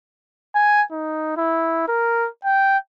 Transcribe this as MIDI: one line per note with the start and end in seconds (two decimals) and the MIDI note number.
0.55 0.83 80
0.92 1.36 63
1.37 1.85 64
1.88 2.28 70
2.45 2.77 79